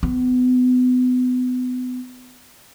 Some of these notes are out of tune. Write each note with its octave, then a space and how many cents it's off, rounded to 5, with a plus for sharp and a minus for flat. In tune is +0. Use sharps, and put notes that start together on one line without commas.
B3 +35